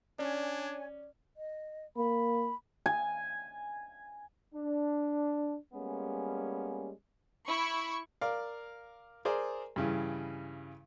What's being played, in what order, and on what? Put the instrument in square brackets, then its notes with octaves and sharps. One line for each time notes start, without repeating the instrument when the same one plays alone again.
[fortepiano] C#4 [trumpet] D4 [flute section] C#5 G#5 [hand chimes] D5
[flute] D#5
[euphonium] A#3 [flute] B5
[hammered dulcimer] G#5
[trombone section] D4
G3 G#3 A#3 B3 C#4
[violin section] E4 B5 C#6
[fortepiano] A#4 D5 F5
G#4 A#4 C5 D5
G2 C#3 E3